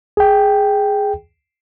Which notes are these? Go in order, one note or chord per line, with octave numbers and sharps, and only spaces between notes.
G#4 G5